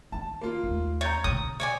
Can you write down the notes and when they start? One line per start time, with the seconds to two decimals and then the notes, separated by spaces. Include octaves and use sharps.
0.12 D#3 A5
0.41 A#3 F4
0.64 D#2 A3
1.01 C#5 A#5 G6 A6
1.24 B2 D3 D#6
1.60 C#5 D5 G#5